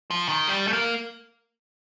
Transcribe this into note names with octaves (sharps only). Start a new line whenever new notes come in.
F3
D#3
G3
A3
A#3